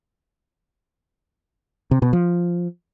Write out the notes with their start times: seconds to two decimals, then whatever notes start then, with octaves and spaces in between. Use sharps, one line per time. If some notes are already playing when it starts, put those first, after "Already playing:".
1.91 C3
2.02 B2
2.13 F3